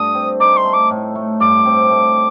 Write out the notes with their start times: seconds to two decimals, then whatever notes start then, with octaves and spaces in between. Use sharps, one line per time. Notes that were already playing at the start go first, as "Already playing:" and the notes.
Already playing: G2 A3 D4 D#6
0.15 C4
0.40 D#4 D6
0.56 C6
0.65 A3
0.73 D6
0.90 A2
1.15 A3
1.40 G2 D6
1.65 C4
1.90 A3